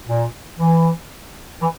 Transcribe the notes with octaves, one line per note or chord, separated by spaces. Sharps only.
A#2
E3
E3